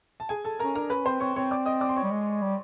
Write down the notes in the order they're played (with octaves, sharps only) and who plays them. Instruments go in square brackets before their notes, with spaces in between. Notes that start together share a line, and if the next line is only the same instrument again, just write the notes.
[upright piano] A5
G#4 G#5
A4 A5
[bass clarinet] C#4 [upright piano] A#4 A#5
[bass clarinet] D4 [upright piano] A#4 A#5
[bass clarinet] C#4 [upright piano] B4 B5
[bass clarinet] C4 [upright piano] C5 C6
[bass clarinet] C4 [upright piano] C#5 C#6
[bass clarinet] C4 [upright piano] C#5 C#6
[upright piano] D5 D6
D#5 D#6
D5 D6
C6
C#5 C#6
[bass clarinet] G3
G#3
G3